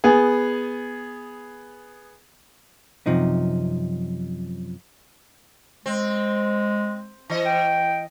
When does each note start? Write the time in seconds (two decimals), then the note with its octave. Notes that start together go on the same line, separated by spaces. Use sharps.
0.04 B3 G#4
3.06 F#2 C3 F3 D#4
5.86 G#3 C4
7.30 E3 D#5
7.46 G5